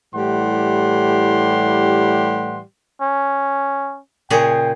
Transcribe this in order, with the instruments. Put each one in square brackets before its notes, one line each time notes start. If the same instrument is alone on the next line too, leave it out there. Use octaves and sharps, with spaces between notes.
[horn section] A2 E3 G3 G4 F#5 C6
[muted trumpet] C#4
[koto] A#2 C#3 G#4 [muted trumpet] G5